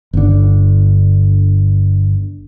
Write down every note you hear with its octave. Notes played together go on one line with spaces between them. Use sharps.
G1 D3